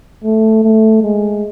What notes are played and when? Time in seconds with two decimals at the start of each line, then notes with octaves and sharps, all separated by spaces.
0.24 A3
0.63 A3
1.02 G#3